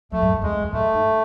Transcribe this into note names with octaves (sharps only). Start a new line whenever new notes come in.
F#3 A3
G#2
F#2
E2 G#3
E2
F#2
A2 A3
G#2